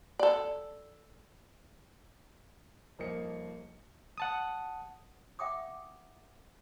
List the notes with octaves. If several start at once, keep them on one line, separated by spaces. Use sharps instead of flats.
A4 D5
D#1 F3 A#3 D#5 C#7
F#5 A5 D#6
E5 F#5 G5 D6 D#6